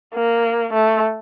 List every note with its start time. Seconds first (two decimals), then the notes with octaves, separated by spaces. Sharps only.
0.15 A#3
0.74 A3